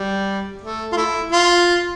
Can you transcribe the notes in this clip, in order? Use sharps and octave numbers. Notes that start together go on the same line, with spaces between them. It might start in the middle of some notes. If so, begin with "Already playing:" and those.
Already playing: G3
A3
F4
A3 E4
F4